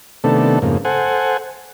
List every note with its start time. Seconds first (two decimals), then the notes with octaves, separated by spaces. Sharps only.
0.24 C3 D#3 A3 B3 D4 A4
0.62 F2 G#2 C#3 A#3
0.85 A4 C5 F#5 G#5